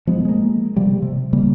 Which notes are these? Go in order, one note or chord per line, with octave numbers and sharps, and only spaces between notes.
F3 G#3 B3
G#3 A#3
C3 F3 G3
C3
C#3 G3 A#3